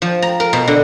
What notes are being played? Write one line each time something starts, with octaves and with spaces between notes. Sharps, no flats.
F3
A#5
A#4
B2
D3